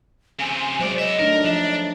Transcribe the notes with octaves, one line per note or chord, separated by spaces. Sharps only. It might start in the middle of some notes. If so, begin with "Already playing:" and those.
C#3 C4 G#5
C3 F#3 G#3 C5 D5
B3 D#5 E5
A3 D4 D#4 A#4
F3 D4